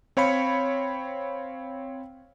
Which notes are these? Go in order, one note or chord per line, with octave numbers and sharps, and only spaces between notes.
C4 C#5 F5 B5 C#7